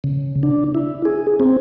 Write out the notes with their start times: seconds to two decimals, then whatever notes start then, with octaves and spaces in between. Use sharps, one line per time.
0.04 C#3
0.43 D4
0.75 E4
1.05 G#4
1.40 C4